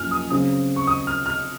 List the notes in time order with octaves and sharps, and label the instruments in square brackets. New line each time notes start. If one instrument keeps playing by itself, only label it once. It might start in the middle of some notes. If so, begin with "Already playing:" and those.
Already playing: [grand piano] F#2 F3 A#3 G#5 F6
D#6
C#3 F#3 C4 D#6
C#6
D#6
F6
F6